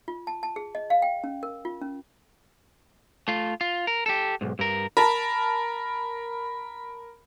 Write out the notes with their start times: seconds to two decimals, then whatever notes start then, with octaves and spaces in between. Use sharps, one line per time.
0.08 F4
0.27 A5
0.43 A5
0.56 G#4
0.75 D#5
0.90 F5
1.02 G5
1.24 C#4
1.43 A#4
1.65 F4
1.82 C#4
3.28 A3 F4
3.61 F4
3.87 A#4
4.06 G4 A4
4.41 B1 G#2
4.59 G2 A#4
4.97 A#4 A5 B5